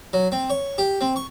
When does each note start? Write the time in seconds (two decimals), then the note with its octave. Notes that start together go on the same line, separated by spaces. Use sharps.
0.13 F#3
0.32 C4
0.50 C#5
0.78 G4
1.01 C4
1.16 C#6